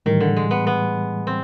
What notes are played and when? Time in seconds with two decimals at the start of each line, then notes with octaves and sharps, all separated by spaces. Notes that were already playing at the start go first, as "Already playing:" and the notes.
0.06 A2 D#3 E3 G3
0.20 D3
0.37 G#3
0.51 B3
0.67 B3
1.27 C4